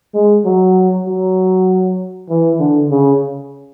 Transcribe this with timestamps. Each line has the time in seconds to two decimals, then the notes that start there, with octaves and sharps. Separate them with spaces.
0.14 G#3
0.45 F#3
1.06 F#3
2.29 E3
2.60 D3
2.90 C#3